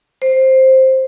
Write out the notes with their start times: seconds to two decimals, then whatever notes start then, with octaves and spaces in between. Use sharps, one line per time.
0.22 C5